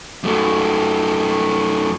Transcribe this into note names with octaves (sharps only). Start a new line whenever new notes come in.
F#2 A3